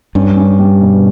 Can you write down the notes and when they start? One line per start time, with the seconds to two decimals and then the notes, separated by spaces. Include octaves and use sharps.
0.15 G2 C#4
0.36 C#4
0.59 G3
0.81 B2